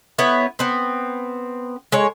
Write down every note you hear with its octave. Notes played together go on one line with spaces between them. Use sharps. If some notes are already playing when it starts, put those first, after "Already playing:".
B3 E4 C#5
B3 C4
G#3 C#5